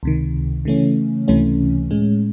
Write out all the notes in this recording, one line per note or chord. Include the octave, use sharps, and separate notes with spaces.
C#2 C3 D#3
C#3 E3 A3 C#4
C#2 C3 E3 A3 C#4
A2 G#3 C#4